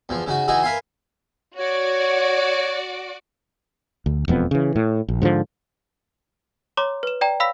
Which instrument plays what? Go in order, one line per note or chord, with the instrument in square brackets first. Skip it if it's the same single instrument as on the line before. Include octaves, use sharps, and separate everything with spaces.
[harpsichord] E2 F3
C#3 D#4 F#4
E3 D#4 F#4 G#4 D#5
A#4 B4 E5 F5 G#5 C6
[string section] F#4 D5 [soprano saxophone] C#5
[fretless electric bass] D2
E1 F2 B3
C#3 E3
A2
A#1
G#2 D3 E3 F3
[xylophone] C#5 A#5 C6 D6
B4 E7
D5 G5 A#5
C#5 F5 B5 E6 A#6 B6